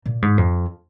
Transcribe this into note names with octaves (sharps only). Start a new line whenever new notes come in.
A#2
G#2
F2